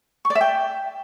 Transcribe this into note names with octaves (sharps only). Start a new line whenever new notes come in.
C#6
D5
E5
G5